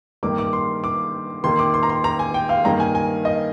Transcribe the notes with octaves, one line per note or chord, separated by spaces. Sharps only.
G2 D#3 A#3 D6
D6
C6
D6
D#2 D#3 A#3 C6
D6
C6
A#5
C6
A#5
G#5
G5
F5
G2 D#3 A#3 A#5
G#5
G#5
D#5